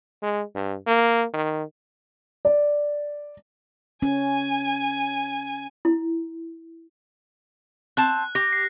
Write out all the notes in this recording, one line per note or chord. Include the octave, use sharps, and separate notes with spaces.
G#3
G2
A#3
D#3
D5
C#4 G#5
E4
C4 A5 F#6
G4 A#6
C7